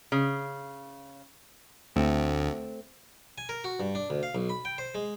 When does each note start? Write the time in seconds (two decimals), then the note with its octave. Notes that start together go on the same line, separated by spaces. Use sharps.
0.12 C#3
1.96 D2 A3 C4
3.38 G#5
3.49 A#4
3.64 F#4
3.80 G2
3.95 D4
4.10 D2
4.23 F5
4.35 B1
4.50 B5
4.65 G5
4.78 C5
4.95 G#3